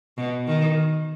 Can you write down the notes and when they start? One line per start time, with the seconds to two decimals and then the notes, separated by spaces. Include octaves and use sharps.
0.18 B2
0.47 D#3